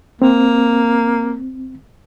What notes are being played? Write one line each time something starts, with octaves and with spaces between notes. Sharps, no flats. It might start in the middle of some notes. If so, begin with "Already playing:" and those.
A#3 C4